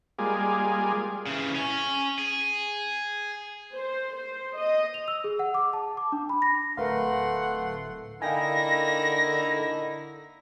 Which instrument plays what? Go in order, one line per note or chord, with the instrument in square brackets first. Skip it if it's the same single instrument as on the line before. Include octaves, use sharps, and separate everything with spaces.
[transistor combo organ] G3 G#3 A#3 F4 G#4 D5
[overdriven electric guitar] C#3 E3
C#4
G#4
[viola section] C5
C5
D#5
[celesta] F7
E6
G#4
F#5
D6
A5
D6
D4
B5
A#6
[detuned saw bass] D1 [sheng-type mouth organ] A3 C6 [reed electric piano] A#4 B4 F5 [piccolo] F#5
[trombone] D3 [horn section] A#3 D#4 E4 [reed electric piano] F5 G5 G#5 [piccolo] A#6